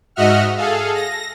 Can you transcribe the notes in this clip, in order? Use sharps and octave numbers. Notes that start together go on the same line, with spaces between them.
G#2 F#4 D#5 E5 F#5 F6
G#4 A4 F5
A#6